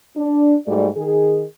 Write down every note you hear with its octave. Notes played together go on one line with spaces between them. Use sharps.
D4
G#2 G3 A3 F#4 D5
D#3 G#4